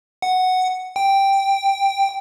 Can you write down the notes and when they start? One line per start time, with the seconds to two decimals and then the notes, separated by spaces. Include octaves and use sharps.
0.22 F#5
0.96 G5